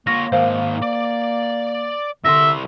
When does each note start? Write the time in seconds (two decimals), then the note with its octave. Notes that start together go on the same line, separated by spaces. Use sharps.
0.07 A#3 F4 C#5 A#6
0.32 G#2 D#3 C5 F5
0.82 D5 D6
2.25 C2 D3 E5 C6 A#6